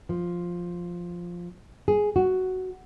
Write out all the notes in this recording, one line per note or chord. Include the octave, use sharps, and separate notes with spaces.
F3
G#4
F#4